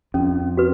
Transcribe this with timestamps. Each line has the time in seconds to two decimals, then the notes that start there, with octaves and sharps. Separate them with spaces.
0.14 F2 C#4
0.57 F#4 B4